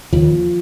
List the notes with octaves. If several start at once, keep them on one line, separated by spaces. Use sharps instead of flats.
D#2 F3